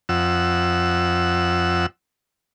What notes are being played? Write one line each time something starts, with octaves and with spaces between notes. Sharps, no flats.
F2 F#5 E6